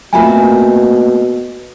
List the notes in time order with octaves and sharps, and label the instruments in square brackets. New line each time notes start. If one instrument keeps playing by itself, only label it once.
[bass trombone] B2 [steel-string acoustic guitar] A3 A#3 C4 [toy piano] F4 E5 G#5